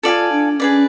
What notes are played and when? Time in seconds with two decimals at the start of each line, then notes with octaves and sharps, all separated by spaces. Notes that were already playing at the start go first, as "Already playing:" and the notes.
0.03 F4 A4 D5 F5 G#5
0.32 D4
0.59 C#4 G#4 B4 D5